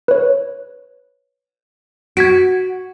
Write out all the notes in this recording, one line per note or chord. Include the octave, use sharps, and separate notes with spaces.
B4 C#5
F#4 G#6 B6 D7